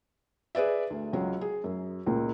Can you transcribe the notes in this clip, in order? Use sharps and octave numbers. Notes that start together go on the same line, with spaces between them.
G#4 B4 D5 E5
D2
C#2 F#3
G#4
F#2
C#2 A#2